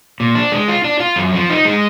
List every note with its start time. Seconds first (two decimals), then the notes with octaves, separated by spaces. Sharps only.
0.20 A#2
0.35 D4
0.52 G#3
0.68 F4
0.84 D4
1.00 F4
1.16 F#2
1.33 F3
1.50 D#4
1.65 G#3